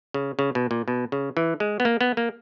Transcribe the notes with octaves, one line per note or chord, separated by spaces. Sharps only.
C#3
C#3
B2
A#2
B2
C#3
E3
G#3
B3
A#3
B3
A#3